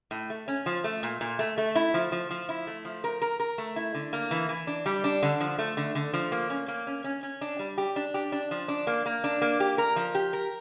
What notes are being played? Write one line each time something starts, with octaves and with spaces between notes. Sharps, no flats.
A2
A3
C#4
F3
A3
A#2
A#2
A3
A3
E4
F3
F3
F3
E4
A3
F3
A#4
A#4
A#4
A3
E4
D3
A#3
E3
E3
D4
G3
D4
D3
F3
A3
D3
D3
F3
A#3
C#4
A#3
C#4
C#4
C#4
D4
G3
G4
D4
G4
D4
F3
D4
A#3
A#3
D4
A#3
G4
A#4
F3
G4
A#4